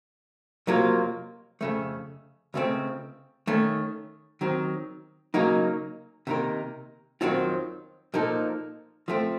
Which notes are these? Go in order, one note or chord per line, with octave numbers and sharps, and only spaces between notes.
F2 C3 F#3 A#3 F4
F2 C#3 A3
C#2 C#3 A3 C4
D#3 A3 C#4
D#3 F#3 C4
C#3 F#3 A#3 D#4
C3 D#3 A#3 D#4 A#4
F2 D#3 F#3 C4 F4
A#2 F3 A#3 D#4 A4
F3 A3 C4